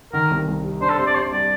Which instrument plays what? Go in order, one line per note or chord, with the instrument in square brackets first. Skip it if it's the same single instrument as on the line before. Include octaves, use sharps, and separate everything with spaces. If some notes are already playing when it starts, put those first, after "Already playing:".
[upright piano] D#3 [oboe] A#4
[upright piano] C2
C2
C3
[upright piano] D4 [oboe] C5
[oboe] A4
[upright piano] C3 [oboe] C5
[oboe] D5
[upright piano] C3 [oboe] C5
[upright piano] G3 [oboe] D5